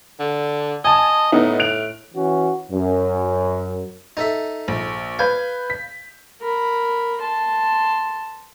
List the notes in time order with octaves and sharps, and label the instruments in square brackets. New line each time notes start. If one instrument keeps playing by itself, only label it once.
[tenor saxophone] D3
[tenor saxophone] D#5 [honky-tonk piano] G#5 A5
[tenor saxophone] A2 [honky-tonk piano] B3 D#4
[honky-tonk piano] F#6 D7 F7
[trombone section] E3 C#4 F#4
F#2
[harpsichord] D#4 A4 E5
[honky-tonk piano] A#1
[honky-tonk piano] B4 G6 G#6 [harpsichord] F5
[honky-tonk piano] B6
[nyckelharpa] A#4 B5
A5 C6